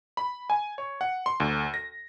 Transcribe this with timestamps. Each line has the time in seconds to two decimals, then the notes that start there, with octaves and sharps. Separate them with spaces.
0.17 B5
0.50 G#5
0.78 C#5
1.01 F#5
1.26 C6
1.40 D2
1.74 A#6